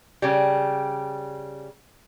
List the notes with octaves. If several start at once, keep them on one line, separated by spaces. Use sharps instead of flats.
C#3 G3